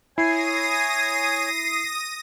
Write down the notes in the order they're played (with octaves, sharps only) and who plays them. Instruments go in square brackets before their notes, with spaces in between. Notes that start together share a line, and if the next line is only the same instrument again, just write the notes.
[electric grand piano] E4 [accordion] C#5 G#5 [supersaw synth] D#6 A#6 D#7 [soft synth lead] C7